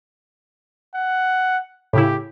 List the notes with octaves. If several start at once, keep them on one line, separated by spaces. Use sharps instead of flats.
F#5
A2 C#3 E4 G4